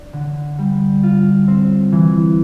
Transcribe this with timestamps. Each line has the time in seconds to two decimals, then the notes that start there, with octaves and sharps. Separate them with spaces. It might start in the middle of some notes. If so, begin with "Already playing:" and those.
Already playing: D4
0.13 D3
0.59 G3
1.03 F4
1.48 C4
1.92 E3